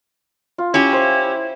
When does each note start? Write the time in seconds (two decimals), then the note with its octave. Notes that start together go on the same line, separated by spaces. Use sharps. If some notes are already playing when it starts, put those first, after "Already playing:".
0.58 F4
0.74 C#4 E4 G4
0.93 C5 E5